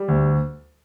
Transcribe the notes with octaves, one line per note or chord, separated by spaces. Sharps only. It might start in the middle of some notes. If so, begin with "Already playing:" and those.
Already playing: G3
D2